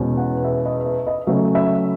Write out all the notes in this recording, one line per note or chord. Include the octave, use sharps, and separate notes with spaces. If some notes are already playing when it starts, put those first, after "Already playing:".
Already playing: E2 B2 G#3 C#4
F#5
E5
D#5
E5
D#5
C#3 F#3 A3 C#4 E5
E5